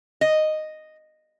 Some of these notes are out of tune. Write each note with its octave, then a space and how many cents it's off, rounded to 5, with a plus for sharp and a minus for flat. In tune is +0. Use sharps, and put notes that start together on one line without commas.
D#5 -5